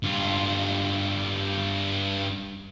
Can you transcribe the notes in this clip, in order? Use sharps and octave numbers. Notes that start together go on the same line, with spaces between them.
G2 F4